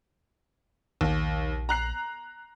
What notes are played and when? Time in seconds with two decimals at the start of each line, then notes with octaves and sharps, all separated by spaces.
1.01 A#1 D#2
1.69 A#5 F#6 C7